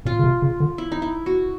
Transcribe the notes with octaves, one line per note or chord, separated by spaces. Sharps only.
A#2 F4
C#3
C3
C#3
D3
E4
D#4
E4
F#4